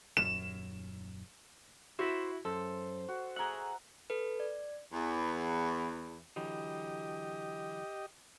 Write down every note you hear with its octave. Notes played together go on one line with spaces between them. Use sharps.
D#1 F#2 E7
E4 F#4 C5 E5
F#2 A4 C5
F#4
G#4 E5 F#5 A#5
A4 B4
D5
E2
D3 E3 F#3 G4 D#5